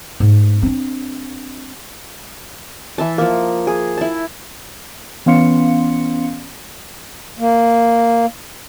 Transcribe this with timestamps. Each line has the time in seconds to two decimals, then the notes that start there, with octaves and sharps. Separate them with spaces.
0.20 G#2 A3
0.62 C4 D4
2.98 E3 E5 A5
3.18 F3 A#3
3.67 G#4
3.97 E4 A5
5.26 E3 B3 C#4 F5 C6 C#7
7.39 A#3